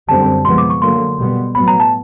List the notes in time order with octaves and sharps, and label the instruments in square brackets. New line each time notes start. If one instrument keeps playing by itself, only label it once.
[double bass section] F#2 D3 G3 C4 [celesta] A5
[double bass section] C3 F3 G#3 B3 [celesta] C6
[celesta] D6
C#6
[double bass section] D3 F#3 A#3 [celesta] C6
[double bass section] B2 G3 B3
[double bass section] A2 F#3 B3 [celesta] B5
[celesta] A#5
A5